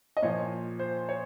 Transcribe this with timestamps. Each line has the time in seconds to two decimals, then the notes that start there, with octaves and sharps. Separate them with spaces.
0.17 D#5
0.22 A#2 F3 C#5
0.79 C5
1.09 C#5